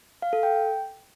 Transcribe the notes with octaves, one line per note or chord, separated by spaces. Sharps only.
F5
A4
G5